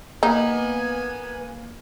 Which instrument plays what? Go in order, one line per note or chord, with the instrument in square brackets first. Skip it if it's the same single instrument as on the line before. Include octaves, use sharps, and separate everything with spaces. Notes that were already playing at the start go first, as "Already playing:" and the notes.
[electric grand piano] A#3 [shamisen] D#4 [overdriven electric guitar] B4 F#5 [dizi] G#5